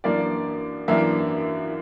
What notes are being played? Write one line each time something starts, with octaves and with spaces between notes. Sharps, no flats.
F#2 E3 A#3 D4 D5
F#2 E3 A#3 D4 E5